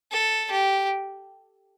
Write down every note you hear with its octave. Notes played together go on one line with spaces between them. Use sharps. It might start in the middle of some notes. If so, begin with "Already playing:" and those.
A4
G4